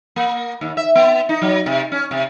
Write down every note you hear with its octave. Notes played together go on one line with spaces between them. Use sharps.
A#3
D#2
E5
B3
D#4
F#3
C3
C#4
C3